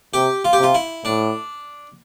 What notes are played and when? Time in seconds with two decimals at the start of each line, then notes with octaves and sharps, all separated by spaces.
0.14 C3 G4
0.45 F4
0.53 G4
0.59 C3 F4
0.74 E4
1.05 A2 D4